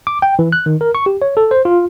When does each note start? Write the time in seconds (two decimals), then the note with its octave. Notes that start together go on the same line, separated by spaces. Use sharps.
0.07 D6
0.22 G5
0.39 E3
0.52 F#6
0.66 D#3
0.81 A#4
0.95 C#6
1.06 G4
1.22 C#5
1.37 A4
1.51 C5
1.65 F4